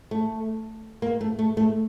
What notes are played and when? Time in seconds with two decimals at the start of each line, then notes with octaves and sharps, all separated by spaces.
0.11 A3
1.02 A#3
1.21 A3
1.39 A3
1.57 A3